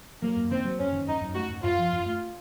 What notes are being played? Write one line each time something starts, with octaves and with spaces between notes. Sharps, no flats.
F#3 A#3
F#2
D#3 C4
F#3
F#2 C#4
D#3
F#2 D#4
F#2
A3 F#4
F#2
F#2 F4
F3
F#2
A3